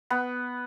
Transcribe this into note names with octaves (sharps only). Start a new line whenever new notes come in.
B3